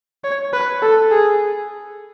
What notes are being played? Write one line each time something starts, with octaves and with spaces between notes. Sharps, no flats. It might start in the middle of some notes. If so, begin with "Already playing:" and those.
C#5
B4
A4
G#4